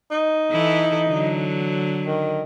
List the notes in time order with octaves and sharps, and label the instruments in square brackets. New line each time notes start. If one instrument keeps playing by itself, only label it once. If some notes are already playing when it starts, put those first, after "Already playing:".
[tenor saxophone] D#4
[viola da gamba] E3 E4 A4
D3 F#3
[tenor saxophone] D#3